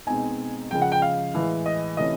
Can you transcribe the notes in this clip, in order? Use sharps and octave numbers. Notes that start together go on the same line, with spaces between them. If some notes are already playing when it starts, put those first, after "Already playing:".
B2 G#3 C4 D#4 G#5
C#3 F3 G#3 G5
F#5
G5
F5
A2 E3 G#3
D#5
C3 E3 A3 C#4 D#5